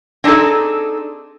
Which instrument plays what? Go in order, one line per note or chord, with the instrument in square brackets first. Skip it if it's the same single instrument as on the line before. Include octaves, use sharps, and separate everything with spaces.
[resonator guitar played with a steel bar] C4 D4 D#4 G#4 A4